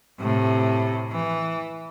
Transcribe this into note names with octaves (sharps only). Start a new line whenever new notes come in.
A2 C3
E3